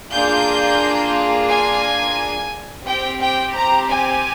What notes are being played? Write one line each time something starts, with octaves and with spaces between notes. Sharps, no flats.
A#3 D4 F4 G#4 G6
G#5
C4 G4 G5
G5
A#5
G#5